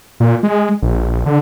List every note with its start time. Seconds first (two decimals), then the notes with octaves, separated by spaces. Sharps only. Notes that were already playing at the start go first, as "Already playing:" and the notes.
0.20 A#2
0.43 G#3
0.82 A#1
1.26 D3